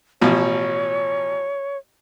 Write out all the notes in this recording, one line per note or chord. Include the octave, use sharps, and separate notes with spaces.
A1 B2 F3 C#5